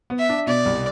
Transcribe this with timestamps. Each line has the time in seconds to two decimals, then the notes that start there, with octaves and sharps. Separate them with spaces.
0.10 B3
0.19 E5
0.29 D4
0.47 B2 D5
0.65 C2